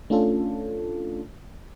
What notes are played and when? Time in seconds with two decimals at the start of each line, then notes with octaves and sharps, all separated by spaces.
0.10 A3 C#4 D4 F4 A4